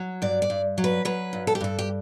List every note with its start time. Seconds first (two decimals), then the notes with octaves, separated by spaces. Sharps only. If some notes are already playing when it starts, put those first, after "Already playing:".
Already playing: F#3
0.22 G2 D5
0.42 D5
0.50 G2
0.78 F#3
0.84 B4
1.05 F#3 B4
1.33 G2
1.47 A4
1.55 G4
1.61 G2 A4
1.79 G4